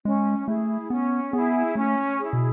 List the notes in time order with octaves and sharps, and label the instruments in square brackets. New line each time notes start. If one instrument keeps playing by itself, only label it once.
[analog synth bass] G#3 [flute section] C#4
[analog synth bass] A3 [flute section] E4 G#4
[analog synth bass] B3 [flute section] C#4
[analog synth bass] B3 [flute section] E4 G#4
[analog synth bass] A3 [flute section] C#4
[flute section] E4 G#4
[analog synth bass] B2